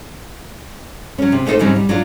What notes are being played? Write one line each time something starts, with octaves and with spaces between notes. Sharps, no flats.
F#3 C#4
C3
A3 A#3 D#4 F4 A4 C5
G#2 C#3 F#3 G3 C4 D#4
G3
F#3 D4 F4